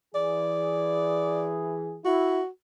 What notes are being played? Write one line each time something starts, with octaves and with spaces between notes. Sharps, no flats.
E3 G#4 D5
E4 F#4